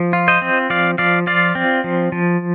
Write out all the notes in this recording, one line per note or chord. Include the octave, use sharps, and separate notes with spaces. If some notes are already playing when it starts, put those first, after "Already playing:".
Already playing: F3
F4
C5 D#5
C4
F3 D5 F5
F3 D5 F5
F4 D5 F5
C4
F3
F3